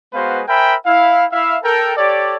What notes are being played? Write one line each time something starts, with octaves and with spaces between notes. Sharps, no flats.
G#3 B3 F#4 B4 C5 F5
A#4 C5 E5 G5 G#5 B5
E4 F5
E4 E5 F5
A4 A#4 G5
G4 A4 C#5 D5